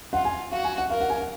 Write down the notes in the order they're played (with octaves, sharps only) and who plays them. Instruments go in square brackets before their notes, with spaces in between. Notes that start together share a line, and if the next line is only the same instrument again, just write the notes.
[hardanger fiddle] F4 [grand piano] F#5
[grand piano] G#5
[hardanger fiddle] F#4 [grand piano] F5
[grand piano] G#5
F#5
[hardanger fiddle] A#4 [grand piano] F5
[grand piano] F#5
G#5
F#5